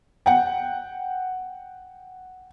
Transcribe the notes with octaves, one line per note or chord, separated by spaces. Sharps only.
F#5 G5